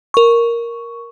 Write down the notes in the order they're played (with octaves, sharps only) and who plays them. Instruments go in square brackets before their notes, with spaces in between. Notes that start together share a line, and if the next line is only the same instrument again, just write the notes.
[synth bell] A#4 C#6